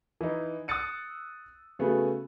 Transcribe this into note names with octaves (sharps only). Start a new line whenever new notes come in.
E3 D#4
D#6 E6 F#6 A6 C#7 D#7
C#3 A3 B3 F#4 G#4